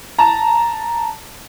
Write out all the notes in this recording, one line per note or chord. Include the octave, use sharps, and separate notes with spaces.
A5 A#5